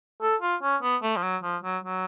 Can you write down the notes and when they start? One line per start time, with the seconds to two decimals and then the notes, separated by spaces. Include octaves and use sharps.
0.22 A4
0.42 F4
0.62 C#4
0.82 B3
1.02 A3
1.17 F3
1.23 F#3
1.43 F3
1.64 F#3
1.84 F#3